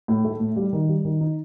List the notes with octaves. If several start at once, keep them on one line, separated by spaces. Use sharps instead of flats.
A2
A3
A2
G3
D#3
G3
D#3
D#4